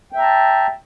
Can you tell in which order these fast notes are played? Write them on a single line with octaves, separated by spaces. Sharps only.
G5 E5 A#5 A5